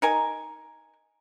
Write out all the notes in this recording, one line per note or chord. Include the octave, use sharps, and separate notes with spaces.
D#4 A#4 G#5